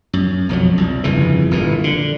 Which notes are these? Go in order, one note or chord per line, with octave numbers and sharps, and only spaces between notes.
F#2
B1 F2 F3 F#3
C2
G1 F2 C#3 E3
G1 A#2 D3 E3
D3